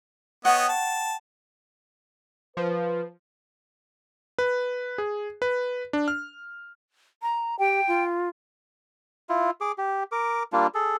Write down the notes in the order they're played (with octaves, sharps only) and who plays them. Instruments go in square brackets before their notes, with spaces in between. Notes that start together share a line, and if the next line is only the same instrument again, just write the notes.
[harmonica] B3 C#5 D#5 [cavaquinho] F#5 G5 C#6
[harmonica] A5
[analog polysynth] F3 [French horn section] B4
[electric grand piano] B4
G#4
B4
D4
F6
[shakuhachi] A#5
[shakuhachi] G4 [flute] G5
[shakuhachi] F4
[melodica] E4 F4
G#4 D6
G4
A#4 D6
G3 A#3 D4 F4
G#4 A4